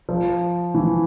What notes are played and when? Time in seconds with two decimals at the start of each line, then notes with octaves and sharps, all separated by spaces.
0.09 F3
0.74 E3